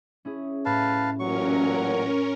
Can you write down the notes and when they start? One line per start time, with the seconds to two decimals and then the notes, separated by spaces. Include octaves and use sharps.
0.25 C#4 E4 G#4
0.65 A2 B4 F5 A5
1.19 A1 A#2 F#3 C#4 A#4 C#6
1.70 F#4 F#6